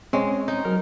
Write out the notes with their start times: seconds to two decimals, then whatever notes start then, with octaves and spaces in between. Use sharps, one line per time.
0.13 G#3 C4 C#4 C#5
0.48 D#4
0.65 F#3 A#4 F6